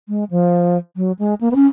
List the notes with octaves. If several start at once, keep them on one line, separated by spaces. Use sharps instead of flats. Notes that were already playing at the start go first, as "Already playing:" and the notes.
G#3
F3
F#3
G#3
A#3
B3
C#4